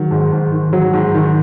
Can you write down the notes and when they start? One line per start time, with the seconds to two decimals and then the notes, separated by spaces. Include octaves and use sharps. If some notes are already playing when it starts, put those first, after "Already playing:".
Already playing: D#3 F#3
0.11 G#2
0.32 G#2
0.52 D#3
0.73 F#3
0.93 G#2
1.14 D#3